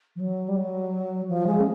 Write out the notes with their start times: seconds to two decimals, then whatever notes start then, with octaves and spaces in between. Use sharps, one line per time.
0.15 F3
0.19 F#3
0.48 G3
0.56 F#3
1.28 F3
1.46 G#3
1.60 C#4